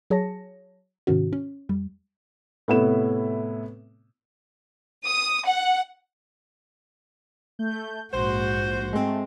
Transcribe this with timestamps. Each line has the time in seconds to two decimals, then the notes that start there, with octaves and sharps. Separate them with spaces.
0.10 F#3 G#4 C#5 A5 A#6 C#7
1.07 G#2 C3 D#3 C#4 F#4
1.33 C#4
1.69 F2 G3
2.68 A2 C3 B3 E4 E7
5.05 D#6
5.46 F#5
7.59 A3 G6
8.13 A#1 G#2 F#4 C5
8.93 G#3 A3 C4